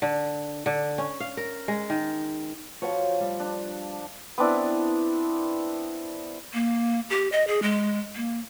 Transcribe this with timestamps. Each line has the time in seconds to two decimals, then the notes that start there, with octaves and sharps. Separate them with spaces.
0.02 D3
0.66 D3
0.98 C#4
1.20 F5
1.37 A#4
1.68 G#3
1.90 D#3
2.82 F3 F#4 B4 C#5
3.20 G3
3.40 D4
4.38 B3 C4 D4 E4
6.54 A#3
7.10 G4
7.32 D#5
7.48 G#4
7.62 G#3
8.16 A#3